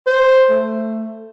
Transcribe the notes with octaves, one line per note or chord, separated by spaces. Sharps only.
C5
A3